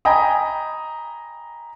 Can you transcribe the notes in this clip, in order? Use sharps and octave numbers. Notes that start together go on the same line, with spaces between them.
D#5 G5 G#5 A#5 B5 D#6